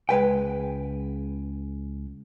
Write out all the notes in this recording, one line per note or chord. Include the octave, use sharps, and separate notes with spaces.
C#2 G#3 B4 G5